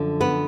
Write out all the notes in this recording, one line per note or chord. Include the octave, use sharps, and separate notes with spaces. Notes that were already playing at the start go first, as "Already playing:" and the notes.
Already playing: F#2 D3 F3
B3 B4